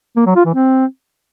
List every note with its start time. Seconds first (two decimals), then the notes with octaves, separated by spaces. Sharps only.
0.17 A#3
0.26 F#3
0.36 F4
0.45 E3
0.55 C4